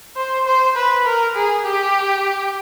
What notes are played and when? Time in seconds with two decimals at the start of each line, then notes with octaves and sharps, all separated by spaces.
0.16 C5
0.46 C5
0.76 B4
1.06 A#4
1.35 G#4
1.65 G4